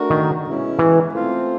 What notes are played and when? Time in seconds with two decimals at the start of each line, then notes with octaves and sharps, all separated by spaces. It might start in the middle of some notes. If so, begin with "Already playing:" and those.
Already playing: A3 D4 F#4 A#4
0.10 D#3
0.45 B2 G#3 C#4 E4
0.79 E3
1.13 A3 C4 F4 A4 C5